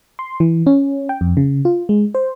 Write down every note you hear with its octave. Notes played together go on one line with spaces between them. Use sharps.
C6
E3
C#4
G5
F2
C#3
F4
G#3
C5